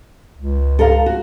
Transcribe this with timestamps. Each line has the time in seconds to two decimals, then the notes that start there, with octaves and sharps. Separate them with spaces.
0.37 C#2
0.79 A4 A#4 F5
1.06 F#4